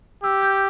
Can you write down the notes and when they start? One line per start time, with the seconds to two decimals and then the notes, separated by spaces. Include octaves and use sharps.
0.23 G4 E6
0.42 G6